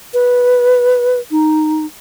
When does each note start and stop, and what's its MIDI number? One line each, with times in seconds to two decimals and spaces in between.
0.14 1.19 71
1.31 1.85 63